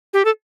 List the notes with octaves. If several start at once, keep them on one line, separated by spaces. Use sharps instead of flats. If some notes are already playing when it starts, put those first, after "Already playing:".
G4
A4